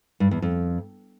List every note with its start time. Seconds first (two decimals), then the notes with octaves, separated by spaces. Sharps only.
0.20 G2
0.31 E2
0.42 F2